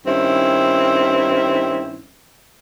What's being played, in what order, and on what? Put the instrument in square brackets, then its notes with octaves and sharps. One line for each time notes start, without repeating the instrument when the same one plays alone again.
[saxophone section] G2 D#3 C4 C#4 E4